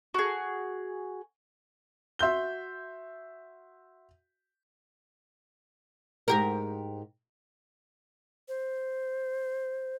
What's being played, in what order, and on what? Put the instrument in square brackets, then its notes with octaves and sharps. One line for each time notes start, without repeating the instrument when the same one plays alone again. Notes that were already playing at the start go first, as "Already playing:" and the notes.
[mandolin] F#4 G#4
[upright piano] F#4 E5 C6 G6 G7
[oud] G#2 G4 A#4
[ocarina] C5